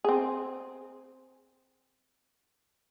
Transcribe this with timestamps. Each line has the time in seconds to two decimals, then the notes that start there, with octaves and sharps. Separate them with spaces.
0.04 C4 G#4